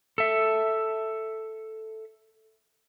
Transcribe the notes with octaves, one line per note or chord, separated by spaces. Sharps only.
A4 E5